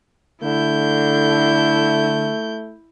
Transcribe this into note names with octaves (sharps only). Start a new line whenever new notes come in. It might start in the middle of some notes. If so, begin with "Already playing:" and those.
D3 A3 E4 G6